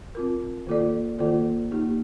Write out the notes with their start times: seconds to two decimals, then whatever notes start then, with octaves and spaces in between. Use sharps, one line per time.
0.15 C4 F4 A#4
0.67 D#3 A#3 F4 A4 D5
1.19 D#3 A#3 F4 A4 D5
1.71 A#3 D#4 G4